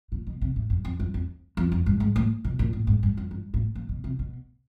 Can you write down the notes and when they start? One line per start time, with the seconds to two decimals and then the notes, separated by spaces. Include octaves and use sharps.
0.12 A#2
0.27 B2
0.41 C3
0.56 A2
0.70 F#2
0.85 F2
1.00 F#2
1.14 F2
1.57 F2
1.72 F2
1.86 G2
2.00 G#2
2.16 A2
2.44 B2
2.59 A#2
2.73 A2
2.87 G#2
3.03 G2
3.17 F#2
3.31 G2
3.54 A2
3.75 A#2
3.89 B2
4.04 C3
4.19 B2